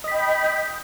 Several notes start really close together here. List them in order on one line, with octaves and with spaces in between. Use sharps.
D#5 B5 G5